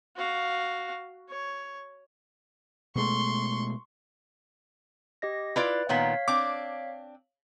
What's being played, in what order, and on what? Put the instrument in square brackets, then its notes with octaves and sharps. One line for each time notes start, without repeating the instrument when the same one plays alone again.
[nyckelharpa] F#4 F5
C#5
[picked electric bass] B2 G#3 A3 [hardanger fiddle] C6 C#6
[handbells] G4 D#5 A#6
[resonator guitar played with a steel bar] E4 F4 D5 [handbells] B4 F#6
[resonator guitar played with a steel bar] A#2 D#3 B3 [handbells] C#5 F5 B6
[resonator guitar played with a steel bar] C4 D4 [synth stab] D6